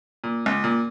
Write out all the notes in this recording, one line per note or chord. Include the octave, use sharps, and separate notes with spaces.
A#2
C#2
A#2